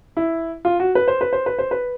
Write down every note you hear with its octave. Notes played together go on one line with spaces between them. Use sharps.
E4
F4
F#4
B4
C5
B4
C5
B4
C5
B4